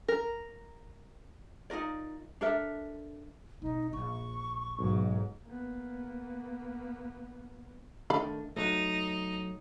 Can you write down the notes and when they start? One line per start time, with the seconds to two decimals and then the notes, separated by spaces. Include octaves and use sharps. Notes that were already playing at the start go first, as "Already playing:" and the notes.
0.08 A#4
1.70 D#4 F4 A#4 D5
2.41 D4 A4 A#4 E5
3.62 B1 C4 D#4
3.93 A#1 C#6
4.79 B1 G#2
5.46 A#3 B3
8.10 D#3 A3 D4 F5 B5
8.57 F#3 A3 D#4